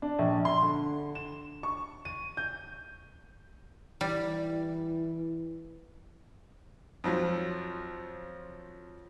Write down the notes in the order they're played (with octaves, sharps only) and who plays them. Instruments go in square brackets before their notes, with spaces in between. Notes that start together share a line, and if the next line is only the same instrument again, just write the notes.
[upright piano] D4
A#1
C6
D3
E7
C#6
D#7
G6
[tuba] E3 [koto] G3
[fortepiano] F2 F3 F#3